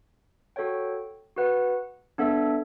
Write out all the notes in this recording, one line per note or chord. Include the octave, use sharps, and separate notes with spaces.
F#4 A4 C#5 G5
F#4 B4 F#5
B3 D4 A4 E5